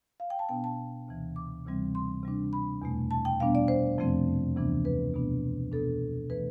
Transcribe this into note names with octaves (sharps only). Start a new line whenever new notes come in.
F5
G5
A5
B2 B3 D4 G5
A5
D2 C3 E3
D6
D2 C3 E3 G3 C4
C6
C3 G3 D4
B5
E2 B2 A3
A5
G5
B2 G3 B3 D4 F5
D5
C5
F2 C3 F3 A3 C4
D2 C3 E3 B3 D4
B4
B2 B3 D4
B2 B3 D4 A4
C3 E3 A3 B4